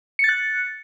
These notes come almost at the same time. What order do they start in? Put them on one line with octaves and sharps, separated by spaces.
C#7 A6 F#6